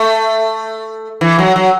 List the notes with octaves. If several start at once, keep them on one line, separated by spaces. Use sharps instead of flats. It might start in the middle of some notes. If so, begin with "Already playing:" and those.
Already playing: A3
E3
F#3
F#3